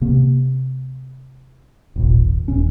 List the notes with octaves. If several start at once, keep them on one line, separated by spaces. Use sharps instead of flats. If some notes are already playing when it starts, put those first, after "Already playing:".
C3 A#3
D#1 G#1 A#2
D#1 D#2 C#4